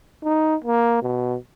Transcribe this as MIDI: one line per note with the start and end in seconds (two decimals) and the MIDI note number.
0.24 0.55 63
0.64 1.01 58
1.02 1.35 47